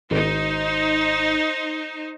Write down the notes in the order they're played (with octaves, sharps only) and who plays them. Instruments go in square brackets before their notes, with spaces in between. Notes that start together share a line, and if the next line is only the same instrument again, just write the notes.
[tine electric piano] G#1 [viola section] D#4 C5